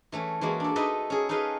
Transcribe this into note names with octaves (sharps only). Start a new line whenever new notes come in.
E3 A3 C#4
E3 G#3 A#3 F#4
D4 A4
D#4 E4 A4 B4 D#5 E5
C#4 G#4
D#4 G#4 A4 B4 D#5 F5